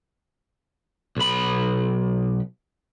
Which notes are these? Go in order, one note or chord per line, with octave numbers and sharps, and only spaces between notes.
B1 B5